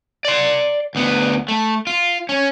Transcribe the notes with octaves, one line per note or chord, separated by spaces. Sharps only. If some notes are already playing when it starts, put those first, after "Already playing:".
D5 C6
D2 B3
A3
F4
C#4